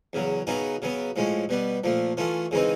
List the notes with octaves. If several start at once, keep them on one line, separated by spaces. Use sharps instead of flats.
E2 C#3 F#3
C#3 F#3 B3 D#4 G#4
C#3 F#3 B3
A2 F3 G#3 C#4
B2 G3 B3
A#2 F3 A3
E3 A3 C#4 F4
C#3 E3 G#3 C4 D#4